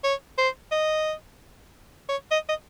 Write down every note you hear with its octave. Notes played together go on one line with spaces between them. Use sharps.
C#5
C5
D#5
C#5
D#5
D#5